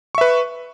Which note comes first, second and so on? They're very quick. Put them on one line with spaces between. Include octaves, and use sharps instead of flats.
C#6 E5 B4